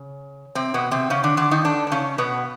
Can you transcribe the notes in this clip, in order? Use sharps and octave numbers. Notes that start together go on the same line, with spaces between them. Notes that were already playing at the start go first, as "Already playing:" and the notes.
Already playing: C#3
C3 C4
B2 B3
C3 C4
C#3 C#4
D3 D4
D3 D4
D#3 D#4
D3 D4
D4
C#3 C#4
B2 B3